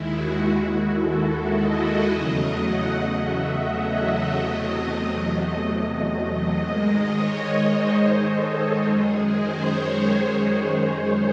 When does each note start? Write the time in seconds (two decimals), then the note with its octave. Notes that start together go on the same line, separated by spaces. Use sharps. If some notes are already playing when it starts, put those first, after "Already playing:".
Already playing: D#2 D#3 G#3 E4
0.13 F#4
0.96 A4
1.53 D#5
2.09 E2 C#3 F#3 A3
2.65 F#5
3.21 E5
3.78 D#5
4.33 E2 C3 F#3 A3 D#5
5.46 D#5
6.58 G#2 D#3 G#3
7.14 C#5
7.70 C5
8.27 A4
8.83 F#2 D#3 G#3 G#4
9.39 C5
9.67 C#5
9.96 C#5
10.24 C5
10.51 C5
10.80 G#4